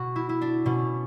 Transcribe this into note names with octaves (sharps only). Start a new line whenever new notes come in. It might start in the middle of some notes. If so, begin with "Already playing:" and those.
Already playing: B2 F#4
E4
E4
D4
B2 C#4